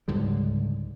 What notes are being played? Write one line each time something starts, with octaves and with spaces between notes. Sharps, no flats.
C#2 G#2 D3 G3